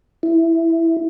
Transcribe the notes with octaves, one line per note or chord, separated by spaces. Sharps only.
E4